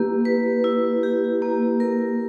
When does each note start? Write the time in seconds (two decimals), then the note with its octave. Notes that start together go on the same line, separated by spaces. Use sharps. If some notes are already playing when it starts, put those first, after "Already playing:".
Already playing: A#3 E4 G4 B4
0.25 B4
0.64 E4
1.03 G4
1.42 A#3
1.80 A#4